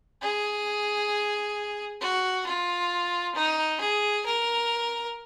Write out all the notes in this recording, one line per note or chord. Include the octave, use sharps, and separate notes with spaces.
G#4
F#4
F4
D#4
G#4
A#4